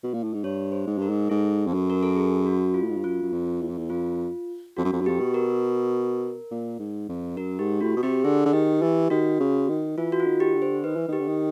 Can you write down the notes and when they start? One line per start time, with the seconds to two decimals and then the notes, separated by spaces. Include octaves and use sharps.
0.03 B2
0.13 A#2
0.23 A2
0.33 G#2
0.44 G2 C#5
0.72 C5
0.87 G#2
0.98 G2 A#4
1.10 G#2
1.30 G#2 A4
1.67 F2
1.74 F#2
1.90 A#4
2.03 A4
2.16 G#4
2.46 F#4
2.74 F4
2.82 A2
2.89 G#2
2.97 G2
3.04 F#2 F4
3.22 F#2
3.32 F2
3.61 E2
3.69 F2
3.77 E2
3.90 F2 F4
4.77 F2 F#4
4.85 F#2
4.93 F2
5.01 F#2
5.06 F2 G4
5.20 B2
5.34 A#4
6.51 A#2
6.79 G#2
7.09 F2
7.37 F#2 A#4
7.59 G#2 G4
7.81 A2 F#4
7.96 B2
8.03 C3 G4
8.24 D3 G#4
8.45 D3
8.53 D#3 G4
8.82 E3 G4
9.10 D#3 F#4
9.40 C#3
9.69 D#3
9.97 E3 F4
10.12 F#4
10.20 F4
10.26 D#3
10.40 G4
10.55 D3
10.62 C5
10.84 D#3 B4
10.96 E3
11.08 D#3 G4
11.20 D3
11.28 D#3